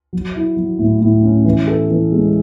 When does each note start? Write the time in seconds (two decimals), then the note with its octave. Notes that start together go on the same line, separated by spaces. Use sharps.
0.13 F#3
0.35 E4
0.57 F#3
0.79 A2
1.01 A2
1.23 C#4
1.45 E3
1.67 A4
1.90 E3
2.12 G#3